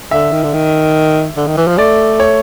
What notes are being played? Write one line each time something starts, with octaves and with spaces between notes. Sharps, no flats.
D3 E5
D#3
D3
D#3
D3
D#3
E3
F3
A3 D5
C#5